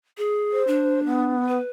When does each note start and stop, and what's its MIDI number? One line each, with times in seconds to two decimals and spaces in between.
0.18 0.63 68
0.52 0.99 72
0.67 1.33 62
1.06 1.58 59
1.48 1.71 71